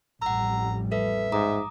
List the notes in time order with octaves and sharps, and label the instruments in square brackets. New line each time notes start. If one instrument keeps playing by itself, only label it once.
[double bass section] A1 F2 G3 [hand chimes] F#5 E6 [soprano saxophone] A#5
[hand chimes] A4 B4 [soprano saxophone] E5
[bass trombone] G#2 [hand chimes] A#5 D6 D#6